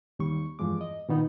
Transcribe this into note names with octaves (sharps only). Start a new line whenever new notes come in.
D#2 G3 C#6
E2 G2 F3 G#3 D6
D#5
A#2 D#3 B3 D#4